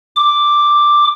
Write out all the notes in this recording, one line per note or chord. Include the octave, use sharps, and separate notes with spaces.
D6